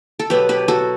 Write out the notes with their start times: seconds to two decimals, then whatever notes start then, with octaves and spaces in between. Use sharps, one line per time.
0.19 A4
0.30 B2 F#3 B3 G4 B4
0.49 G4 B4
0.68 F#4 A4